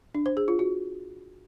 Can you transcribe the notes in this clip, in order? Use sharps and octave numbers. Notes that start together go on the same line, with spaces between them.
D4
C5
G#4
F4
F#4